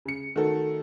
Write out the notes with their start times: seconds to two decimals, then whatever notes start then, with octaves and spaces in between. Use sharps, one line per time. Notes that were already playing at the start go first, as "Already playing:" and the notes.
0.06 C#3 C#7
0.36 D#3 A3 F#4 A4